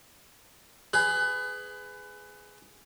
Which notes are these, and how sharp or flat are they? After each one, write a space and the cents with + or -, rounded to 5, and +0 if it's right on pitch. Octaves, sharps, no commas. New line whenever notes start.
G#4 +0 B4 +25